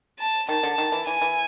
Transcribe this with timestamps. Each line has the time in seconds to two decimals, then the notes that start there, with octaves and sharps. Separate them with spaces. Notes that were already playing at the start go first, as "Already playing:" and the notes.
0.19 A5
0.48 D#3 A5
0.63 D3
0.78 D#3
0.92 E3
1.07 E3 G#5
1.22 E3